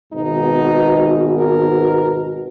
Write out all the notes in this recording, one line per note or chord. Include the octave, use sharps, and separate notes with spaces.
G#1 G#2 B2 D#4
A#4